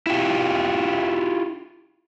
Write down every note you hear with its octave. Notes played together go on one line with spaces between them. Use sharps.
E4 F4 G4